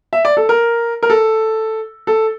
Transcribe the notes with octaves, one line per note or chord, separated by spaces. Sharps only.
E5
D5
A4
A#4
A#4
A4
A4